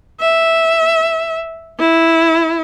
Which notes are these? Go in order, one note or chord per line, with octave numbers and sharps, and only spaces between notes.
E5
E4